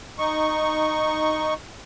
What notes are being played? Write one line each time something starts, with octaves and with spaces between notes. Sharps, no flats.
D#4 C#6